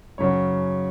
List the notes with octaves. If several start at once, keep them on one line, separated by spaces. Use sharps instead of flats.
F#2 C#3 F#3 C#5